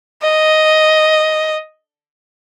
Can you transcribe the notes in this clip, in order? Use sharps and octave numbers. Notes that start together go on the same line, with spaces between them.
D#5